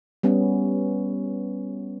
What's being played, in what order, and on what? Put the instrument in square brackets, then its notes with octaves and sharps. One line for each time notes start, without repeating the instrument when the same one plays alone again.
[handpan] G3 B3 C#4